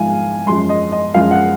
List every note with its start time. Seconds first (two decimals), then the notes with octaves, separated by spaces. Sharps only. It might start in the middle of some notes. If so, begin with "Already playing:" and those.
Already playing: G#2 F3 G#3 F5 G#5
0.46 F#2 F3 G#3 C6
0.69 D#5
0.92 D#5
1.14 F#2 F3 G#3 F5
1.31 F#5